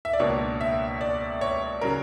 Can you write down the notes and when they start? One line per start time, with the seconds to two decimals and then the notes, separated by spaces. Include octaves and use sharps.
0.05 E5
0.13 D5
0.19 C#2 B2 A#3 D4 C#5
0.61 E5
1.01 D5
1.41 C#5
1.81 C#3 F#3 A#4